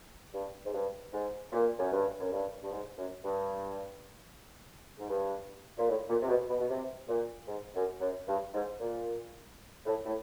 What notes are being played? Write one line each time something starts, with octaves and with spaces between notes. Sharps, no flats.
G2
G#2
G2
G#2
A#2
F#2
G2
F#2
G2
G2
G#2
F#2
G2
G#2
G2
A#2
A2
A#2
C3
B2
B2
B2
C3
A#2
G#2
F#2
F#2
G2
G#2
A#2
A2
A2